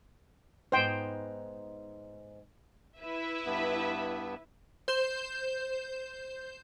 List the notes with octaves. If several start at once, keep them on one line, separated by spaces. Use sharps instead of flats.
G#2 B3 D#4 C5 G5
E4 B4 E5
G2 B3
C5 G6 E7